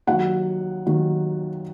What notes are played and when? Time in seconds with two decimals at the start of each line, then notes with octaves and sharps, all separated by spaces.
0.07 D#2 D#3 F#3 F#5
0.86 D#2 D#3 F#3